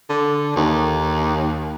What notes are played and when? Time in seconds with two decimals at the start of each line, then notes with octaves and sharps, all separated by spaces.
0.09 D3
0.56 D#2